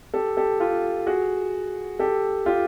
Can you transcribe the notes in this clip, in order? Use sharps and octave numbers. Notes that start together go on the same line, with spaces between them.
G4 A4
G4 A4
F4 G4
F#4 G#4
G4 A4
F4 G4